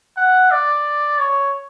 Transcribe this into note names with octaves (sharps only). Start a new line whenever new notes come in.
F#5
D5
C#5